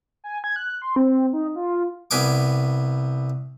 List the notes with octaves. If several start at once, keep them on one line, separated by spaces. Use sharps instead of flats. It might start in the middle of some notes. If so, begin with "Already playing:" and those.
G#5
G#6
F#6
C6
C4
D#4
F4
C2 B3 G#5 D6